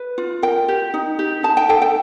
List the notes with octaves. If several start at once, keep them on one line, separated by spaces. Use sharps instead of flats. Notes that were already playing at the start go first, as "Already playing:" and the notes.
Already playing: B4
F4
A#4 G5
G4
D#4
G4
D#4 A5
G5
A4 G5
G5